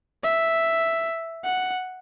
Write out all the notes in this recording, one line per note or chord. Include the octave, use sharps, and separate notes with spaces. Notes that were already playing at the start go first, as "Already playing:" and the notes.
E5
F#5